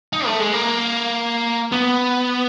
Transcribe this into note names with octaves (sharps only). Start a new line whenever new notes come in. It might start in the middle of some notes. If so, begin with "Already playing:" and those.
D#4
A3
G#3
A#3
B3